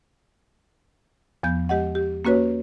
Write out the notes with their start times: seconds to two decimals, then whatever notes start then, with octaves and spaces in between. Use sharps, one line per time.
1.43 E2 F3 B3 G6
1.69 G#3 G4 D#5 F#5
1.95 G4
2.25 A#3 C#4 F#4 B4 C#5